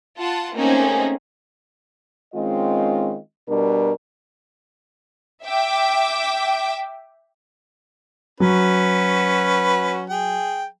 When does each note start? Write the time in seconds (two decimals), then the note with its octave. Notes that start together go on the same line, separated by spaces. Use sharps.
0.19 F4 F#5 A5
0.55 A3 A#3 C4 C#4 D#4 G#4
2.34 D#3 G#3 C4 C#4 F4 D#5
3.48 B2 G3 D4 A#4
5.45 E5 G5 D6
8.40 F#3 C#4 F#4 B4
10.10 G#4 G5